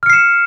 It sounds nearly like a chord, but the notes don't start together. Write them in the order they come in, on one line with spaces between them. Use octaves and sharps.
F6 C#7 C7 E7